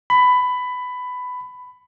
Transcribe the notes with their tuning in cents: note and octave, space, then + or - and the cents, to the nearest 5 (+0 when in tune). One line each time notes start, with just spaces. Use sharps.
B5 +15